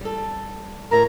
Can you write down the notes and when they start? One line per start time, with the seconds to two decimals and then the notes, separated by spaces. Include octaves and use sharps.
0.01 G3 A4
0.91 A2 E4 A#4 A#5